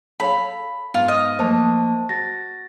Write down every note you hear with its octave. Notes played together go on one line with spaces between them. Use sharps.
A4 C#5 F5 B5
G#2 B3 F4
D#5 D#6 F6
F3 A3 A#3 C5 A5
F#4 A6 A#6